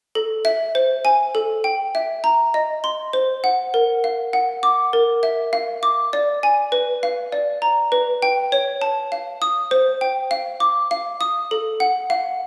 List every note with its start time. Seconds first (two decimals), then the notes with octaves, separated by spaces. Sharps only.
0.15 A4
0.45 E5
0.75 C5
1.05 G#5
1.35 A4
1.64 G5
1.95 E5
2.24 A#5
2.54 D#5
2.84 C6
3.13 C5
3.44 F#5
3.74 A#4
4.04 F5
4.33 F#5
4.63 D6
4.93 A#4
5.23 E5
5.53 F5
5.83 D6
6.13 D5
6.43 G#5
6.72 B4
7.03 F5
7.32 D5
7.62 A#5
7.92 B4
8.22 G5
8.52 C#5
8.82 A5
9.12 F5
9.42 D#6
9.71 C5
10.01 G5
10.31 F5
10.60 D6
10.91 F5
11.21 D#6
11.51 A4
11.80 F#5
12.10 F5